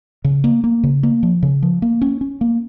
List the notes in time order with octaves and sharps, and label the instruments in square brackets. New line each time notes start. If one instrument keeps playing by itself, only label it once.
[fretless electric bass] C#3
A#3
A#3
C#3
A#3
F3
C#3
F3
A#3
C#4
C#4
A#3